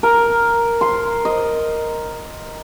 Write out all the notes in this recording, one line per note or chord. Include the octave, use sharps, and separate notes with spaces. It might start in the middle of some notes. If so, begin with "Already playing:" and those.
A#4
C6
D#5